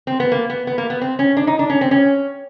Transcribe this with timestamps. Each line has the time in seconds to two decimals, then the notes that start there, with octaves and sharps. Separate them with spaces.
0.07 C4
0.20 B3
0.32 A#3
0.50 B3
0.67 B3
0.78 A#3
0.90 B3
1.01 C4
1.19 C#4
1.37 D4
1.47 D#4
1.59 D4
1.70 C#4
1.81 C4
1.91 C#4